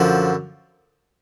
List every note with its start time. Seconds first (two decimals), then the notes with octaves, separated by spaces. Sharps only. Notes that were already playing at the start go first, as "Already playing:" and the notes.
Already playing: F#2 D3 F3